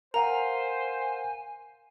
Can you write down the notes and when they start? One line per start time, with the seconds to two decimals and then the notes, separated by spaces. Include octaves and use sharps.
0.14 A#4 C5 F5 F#5 G#5 A#5